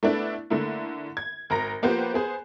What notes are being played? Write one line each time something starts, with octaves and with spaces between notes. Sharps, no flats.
A3 B3 D4 E4
D3 A3 A#3 E4
G#6
G#1 A#4 A#5 A#6
F3 A#3 B3 G4 C5
B3 G#4 C5